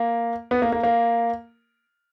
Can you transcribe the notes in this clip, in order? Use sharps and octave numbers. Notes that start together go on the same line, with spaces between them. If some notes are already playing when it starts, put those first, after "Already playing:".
Already playing: A#3
B3
A#3
A#3
A#3